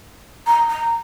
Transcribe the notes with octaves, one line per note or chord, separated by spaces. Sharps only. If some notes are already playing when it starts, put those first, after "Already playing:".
A#5
A#5